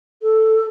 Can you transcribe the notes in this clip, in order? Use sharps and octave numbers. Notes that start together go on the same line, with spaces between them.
A4